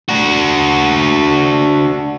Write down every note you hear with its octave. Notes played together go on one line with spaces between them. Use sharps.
D4 F#4